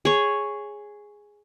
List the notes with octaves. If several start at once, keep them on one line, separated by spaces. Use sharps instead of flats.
G#4 C#5